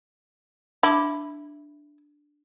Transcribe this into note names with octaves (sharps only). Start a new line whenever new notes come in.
D4 E4 B5 D6